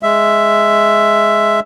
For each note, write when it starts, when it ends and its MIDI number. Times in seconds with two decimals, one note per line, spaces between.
0.03 1.60 56
0.03 1.60 76